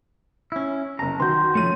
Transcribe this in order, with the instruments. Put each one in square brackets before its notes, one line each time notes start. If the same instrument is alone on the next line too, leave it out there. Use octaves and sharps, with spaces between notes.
[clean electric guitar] C#4 E4
[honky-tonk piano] F#1 A5 [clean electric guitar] A#5
[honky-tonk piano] D#3 F#4 [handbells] C6 G6
[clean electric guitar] F3 A3 [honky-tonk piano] C#4 D#7